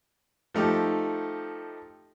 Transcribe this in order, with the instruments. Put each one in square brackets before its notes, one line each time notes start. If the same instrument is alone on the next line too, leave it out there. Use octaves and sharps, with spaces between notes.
[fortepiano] F3 A3 D#4 G4